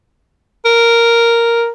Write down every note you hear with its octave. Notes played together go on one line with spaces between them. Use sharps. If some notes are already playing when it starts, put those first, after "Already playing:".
A#4